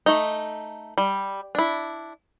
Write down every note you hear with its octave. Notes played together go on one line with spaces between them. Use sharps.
A3 D#4
G3
D4 E4